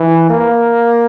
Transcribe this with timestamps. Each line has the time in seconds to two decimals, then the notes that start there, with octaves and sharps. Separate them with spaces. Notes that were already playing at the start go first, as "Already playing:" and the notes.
Already playing: E3
0.30 A#3